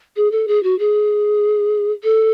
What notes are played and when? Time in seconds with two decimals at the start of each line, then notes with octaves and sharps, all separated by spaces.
0.16 G#4
0.32 A4
0.48 G#4
0.63 F#4
0.79 G#4
2.03 A4